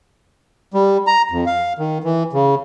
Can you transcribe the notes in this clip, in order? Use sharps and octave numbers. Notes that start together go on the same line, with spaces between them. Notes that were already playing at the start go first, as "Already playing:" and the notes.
G3
A#5
F2
F5
D#3
E3
C#3